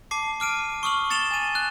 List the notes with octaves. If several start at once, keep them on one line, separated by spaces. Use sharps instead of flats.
A5 D6 C7
D6 F6 D7 D#7
C#6 D#6 F6 F#7
A6 C#7 E7 F7 G7
G#5 D#7
F#6